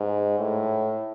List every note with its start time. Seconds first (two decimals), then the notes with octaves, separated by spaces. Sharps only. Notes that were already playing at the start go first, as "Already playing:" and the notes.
Already playing: G#2
0.39 A2